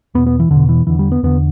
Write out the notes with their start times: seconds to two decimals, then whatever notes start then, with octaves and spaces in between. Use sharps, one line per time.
0.15 E2 B3
0.18 B2
0.27 B3
0.40 E3
0.50 E2 D3
0.56 B2
0.69 E3
0.87 E2 D3 E3
0.99 G3
1.12 B3
1.23 E2 D3 B3